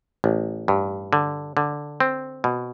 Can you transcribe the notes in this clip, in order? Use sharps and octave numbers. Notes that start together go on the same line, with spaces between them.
A1
G2
D3
D3
C4
B2